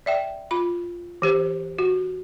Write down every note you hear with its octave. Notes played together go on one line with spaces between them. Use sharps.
D5 E5 G5
F4 B5
E3 G4 C5
F#4